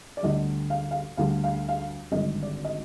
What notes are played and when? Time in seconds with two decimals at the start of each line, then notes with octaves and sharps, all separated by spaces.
0.17 D5
0.23 D2 D3 G3 D#5
0.70 F5
0.91 F5
1.17 D2 D3 G3 F5
1.44 F5
1.69 F5
2.12 G#1 G2 D3 D#5
2.43 D5
2.65 D#5